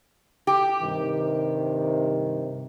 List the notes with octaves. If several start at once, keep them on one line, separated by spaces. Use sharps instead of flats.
G4
G2 C3 D#3